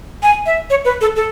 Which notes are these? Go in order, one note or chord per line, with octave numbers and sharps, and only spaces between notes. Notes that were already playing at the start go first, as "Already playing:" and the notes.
G#5
E5
C#5
B4
A4
A4